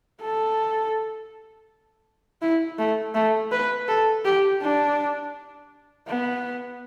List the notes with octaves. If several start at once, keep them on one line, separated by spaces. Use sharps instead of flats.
A4
E4
A3
A3
B4
A4
G4
D4
B3